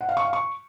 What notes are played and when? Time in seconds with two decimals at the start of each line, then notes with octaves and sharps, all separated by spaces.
0.01 F#5
0.09 F5
0.17 C#6
0.25 F5
0.33 C#6